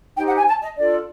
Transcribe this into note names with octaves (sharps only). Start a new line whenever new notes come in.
D#4 G4 C5 G5
F#5
G#5
A5
D#5
D4 F4 A4 D5